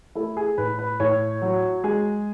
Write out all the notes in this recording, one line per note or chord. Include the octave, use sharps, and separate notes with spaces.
A3 E4
G#4
A2 B4
B4
A2 C#5
F#3
G#3 G#4